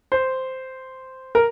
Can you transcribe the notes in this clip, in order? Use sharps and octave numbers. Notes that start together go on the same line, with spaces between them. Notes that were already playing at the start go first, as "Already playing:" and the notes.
C5
A#4